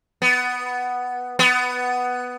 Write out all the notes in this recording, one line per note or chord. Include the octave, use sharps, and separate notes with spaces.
B3
B3